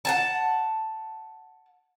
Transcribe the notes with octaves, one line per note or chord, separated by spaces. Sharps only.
F#5 G#5 A5